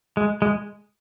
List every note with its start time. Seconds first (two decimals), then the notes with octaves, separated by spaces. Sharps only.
0.17 G#3
0.42 G#3